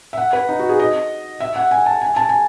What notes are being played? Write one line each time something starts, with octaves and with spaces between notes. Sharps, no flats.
E5
F#5
B4
D#4
F#4
G#4
D#5
E5
F#5
G#5
A5
G#5
A5
G#5